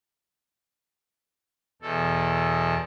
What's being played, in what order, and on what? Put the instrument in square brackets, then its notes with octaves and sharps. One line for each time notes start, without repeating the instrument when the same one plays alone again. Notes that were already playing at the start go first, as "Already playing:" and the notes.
[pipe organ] E2 B2 A4